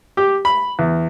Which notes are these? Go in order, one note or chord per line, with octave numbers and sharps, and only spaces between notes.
G4
B5
E2